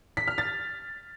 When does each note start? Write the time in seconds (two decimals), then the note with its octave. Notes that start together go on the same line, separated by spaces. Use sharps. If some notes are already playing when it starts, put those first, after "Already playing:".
0.17 B6
0.28 F6
0.38 A6